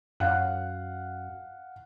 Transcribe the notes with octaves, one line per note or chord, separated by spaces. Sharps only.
F#2 F5 F#5 F#6